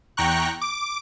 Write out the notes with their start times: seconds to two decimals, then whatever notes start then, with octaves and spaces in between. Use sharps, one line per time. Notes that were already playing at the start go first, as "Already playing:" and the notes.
0.17 E2 G5 A#5 C#6 F#6
0.62 D6